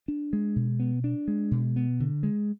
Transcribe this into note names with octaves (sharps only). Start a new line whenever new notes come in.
D4
G#3
B2
B3
D4
G#3
B2
B3
D3
G#3